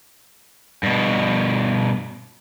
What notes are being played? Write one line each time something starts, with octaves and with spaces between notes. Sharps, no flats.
G2 B2